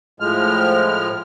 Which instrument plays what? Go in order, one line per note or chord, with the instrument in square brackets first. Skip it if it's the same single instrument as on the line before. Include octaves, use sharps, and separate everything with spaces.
[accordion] A2 F3 G#3 F6